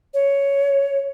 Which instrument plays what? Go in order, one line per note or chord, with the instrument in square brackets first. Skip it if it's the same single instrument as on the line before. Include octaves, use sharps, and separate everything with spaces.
[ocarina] C#5